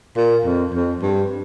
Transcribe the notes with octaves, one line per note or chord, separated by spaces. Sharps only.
A#2
F2
F2
G2